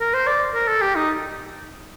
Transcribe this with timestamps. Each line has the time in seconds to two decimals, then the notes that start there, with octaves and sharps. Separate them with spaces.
0.01 A#4
0.14 C5
0.27 D5
0.55 A#4
0.68 A4
0.82 G4
0.95 D#4